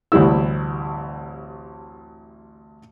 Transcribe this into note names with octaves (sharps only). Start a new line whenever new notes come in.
A1 D2 C3 G3 E4 E6